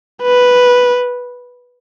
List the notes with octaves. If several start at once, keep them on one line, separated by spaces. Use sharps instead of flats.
B4